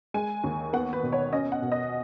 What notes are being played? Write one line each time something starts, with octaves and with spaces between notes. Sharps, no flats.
G#3 G#5
D#2
B3 F#5
B4
B2
C#5
C#4 D#5
F#5
B2
D#5